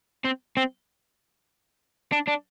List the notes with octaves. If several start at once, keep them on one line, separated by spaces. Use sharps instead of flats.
C4
C4
D4
D4